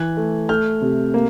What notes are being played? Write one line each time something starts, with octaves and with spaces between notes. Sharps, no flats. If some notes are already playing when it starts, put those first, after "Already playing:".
Already playing: E3 F#6 G#6
A3
A3 F6 G6
C3
A#3